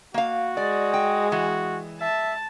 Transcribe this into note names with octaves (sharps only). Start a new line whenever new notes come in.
A#3 F#4 F5
G#3 D5
G5
E3 F#4
E5 A5